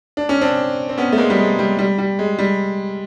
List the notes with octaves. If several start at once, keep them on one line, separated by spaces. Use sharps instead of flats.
D4
C#4
C4 D4
C4
B3 C#4
A3
G#3 A#3
G3
G#3
G3
G3
G3
G#3
G3